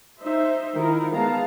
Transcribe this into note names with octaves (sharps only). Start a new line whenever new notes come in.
D#4 C5 E5
D#3 E4 F4 A#4
G#3 B3 F5 A5 A#5